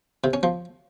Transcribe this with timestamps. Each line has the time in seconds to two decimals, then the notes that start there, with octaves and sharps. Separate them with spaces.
0.24 C3
0.33 C#4
0.43 F3